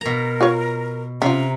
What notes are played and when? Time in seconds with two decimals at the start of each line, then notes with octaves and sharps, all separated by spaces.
0.01 B2 A#4 A#5
0.41 F4 B4 C#5
1.22 C3 C#4 F4 A#5